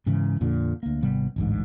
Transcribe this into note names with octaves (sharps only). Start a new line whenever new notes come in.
G#2 C#3 E3
F2 A#2 D3
D2 A#3
G#1 C3 G3 B3
D1 A1 G#2